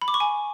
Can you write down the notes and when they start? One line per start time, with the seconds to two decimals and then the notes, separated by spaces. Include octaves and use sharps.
0.02 B5
0.08 D6
0.14 C#6
0.20 G#5